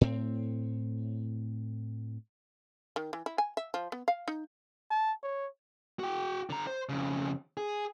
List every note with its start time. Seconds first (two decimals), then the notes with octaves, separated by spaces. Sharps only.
0.01 A2 C4
2.96 D#3
3.13 E3
3.26 E4
3.38 G#5
3.57 E5
3.74 F3
3.92 B3
4.08 F5
4.28 D#4
4.91 A5
5.23 C#5
5.99 F#4 G5
6.50 D3 A#5
6.67 C5
6.89 F2 C#3
7.57 G#4